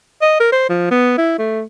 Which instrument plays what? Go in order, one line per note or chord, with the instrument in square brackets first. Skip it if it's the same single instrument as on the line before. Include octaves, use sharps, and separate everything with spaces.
[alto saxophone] D#5
A#4
C5
F3
B3
E4
A3